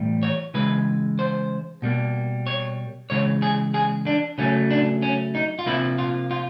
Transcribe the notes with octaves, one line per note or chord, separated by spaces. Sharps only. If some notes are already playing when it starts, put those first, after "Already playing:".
Already playing: A2 E3 G3
C#5
C#3 E3 G#3 B4
C5
B2 G3 A#3
C#5
C#3 E3 G#3 C#5
G#4
G#4
D4
C#3 F#3 A3 C#4
D4
C#4
D#4
F4
C3 F3 A#3 E4
F4
F4